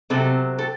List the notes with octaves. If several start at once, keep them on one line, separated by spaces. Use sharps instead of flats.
C3 F#3 C4 A4
A4